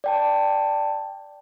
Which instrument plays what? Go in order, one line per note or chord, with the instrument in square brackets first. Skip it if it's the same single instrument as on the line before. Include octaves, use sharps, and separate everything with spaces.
[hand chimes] D5 G5 A5